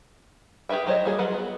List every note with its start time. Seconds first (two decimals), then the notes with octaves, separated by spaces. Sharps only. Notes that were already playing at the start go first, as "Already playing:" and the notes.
0.69 G4 G#4 B4 E5 G5
0.86 F#3 G4 C5 C#5 D#5
1.05 G3 A#3 F#4 G#4
1.19 F#3 F4 B4 F#5
1.34 B3